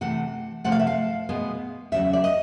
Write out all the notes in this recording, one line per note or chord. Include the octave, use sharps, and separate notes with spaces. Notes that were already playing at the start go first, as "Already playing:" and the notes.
C3 E3 A3 F#5
C3 F3 A3 F#5
F5
E5
F5
B2 G#3 B3
E2 C#3 F#3 E5
D5
D#5